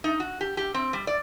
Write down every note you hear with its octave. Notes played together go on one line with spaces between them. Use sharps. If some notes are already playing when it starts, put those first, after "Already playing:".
D#4
F#4
G4
G4
C4
G3
D5